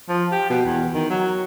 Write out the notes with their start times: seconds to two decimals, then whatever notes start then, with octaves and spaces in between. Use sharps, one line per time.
0.09 F3
0.32 G4
0.50 B2
0.66 E2
0.94 D#3
1.10 F#3